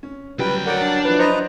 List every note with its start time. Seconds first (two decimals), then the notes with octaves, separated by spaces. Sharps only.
0.03 C#4
0.39 D2 C#3 F#3 G3 B4 G5
0.66 F#3 A#4 D5 F#5 G6 D7
0.82 D4
1.05 F3 F#3 E4 B4
1.19 B4 C5 D#5 A#5